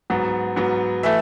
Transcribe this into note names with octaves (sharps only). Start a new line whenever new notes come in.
G#2 F#3 B3
G#2 F#3 B3
E3 A3 E5